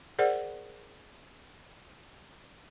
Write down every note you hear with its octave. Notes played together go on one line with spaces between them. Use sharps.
G#4 A#4 C5 D5 F#5